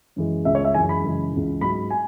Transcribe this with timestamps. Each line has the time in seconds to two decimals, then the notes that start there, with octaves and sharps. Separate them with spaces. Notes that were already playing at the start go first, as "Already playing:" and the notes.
0.16 F#2 E3 G#3
0.45 C#2 C#3 G#3 E5
0.55 C#5
0.64 E5
0.74 F#2 E3 G#3 G#5
0.89 B5
1.04 F#2 C#3 E3 G#3
1.33 C#2 C#3 E3
1.61 G#2 F#3 B5
1.90 G#5